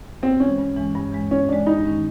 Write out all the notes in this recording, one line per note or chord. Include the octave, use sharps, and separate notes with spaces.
G2 C4
E3 G#3 C#4
G2
E3 G#3
G2
E3 G#3
G2 C#4
E3 G#3 D4
G2 D#4
D#3 G#3 C#4